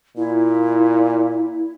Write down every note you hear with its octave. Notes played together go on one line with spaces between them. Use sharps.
A#2 E4